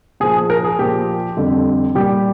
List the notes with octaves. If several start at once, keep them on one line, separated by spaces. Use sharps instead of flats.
A#2 F3 G#4
A#4
G#4
A#2 F3 G4
F2 D3 G3
A#2 G3 G4